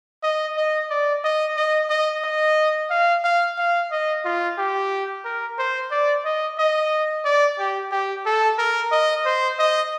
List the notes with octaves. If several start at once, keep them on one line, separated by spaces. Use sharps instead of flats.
D#5
D#5
D5
D#5
D#5
D#5
D#5
F5
F5
F5
D#5
F4
G4
A#4
C5
D5
D#5
D#5
D5
G4
G4
A4
A#4
D#5
C5
D#5